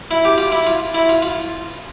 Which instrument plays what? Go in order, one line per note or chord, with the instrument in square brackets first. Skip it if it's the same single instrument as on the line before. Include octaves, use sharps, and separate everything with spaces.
[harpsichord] E4
G4
F4
E4
F4
E4
F4
F4